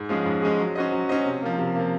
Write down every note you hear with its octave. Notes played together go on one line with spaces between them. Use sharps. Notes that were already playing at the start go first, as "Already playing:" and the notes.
Already playing: G#2
F3 G#3 C#4 G#4
G#2
F3 G#3 C#4 G#4
F#3
C#4 F#4 C5 D#5
F#3
C#4 F#4 C5 D#5
C3
F3 A#3
C3
F3 A#3